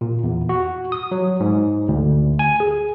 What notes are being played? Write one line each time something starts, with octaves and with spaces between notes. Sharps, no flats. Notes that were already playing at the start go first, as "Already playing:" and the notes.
A#2
E2
F#4
D#6
F#3
G#2
D2
G#5
G#4